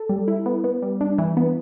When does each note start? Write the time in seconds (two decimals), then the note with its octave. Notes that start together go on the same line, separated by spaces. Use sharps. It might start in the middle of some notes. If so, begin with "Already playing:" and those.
Already playing: A4
0.09 G3
0.28 E4
0.46 B3
0.64 B3
0.82 G3
1.01 D4
1.18 E3
1.37 B3